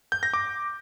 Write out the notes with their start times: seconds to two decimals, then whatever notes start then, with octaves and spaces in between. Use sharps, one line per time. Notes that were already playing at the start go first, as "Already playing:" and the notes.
0.12 G6
0.23 A#6
0.34 D6